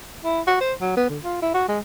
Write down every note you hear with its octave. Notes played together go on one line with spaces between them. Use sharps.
E4
F#4
C5
F#3
B3
D3
F4
E4
F#4
G#3